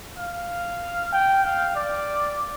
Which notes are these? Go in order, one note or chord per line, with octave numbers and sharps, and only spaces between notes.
F5
G5
F5
D5